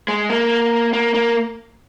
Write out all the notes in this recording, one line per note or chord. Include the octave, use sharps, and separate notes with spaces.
G#3
A#3
A#3
A#3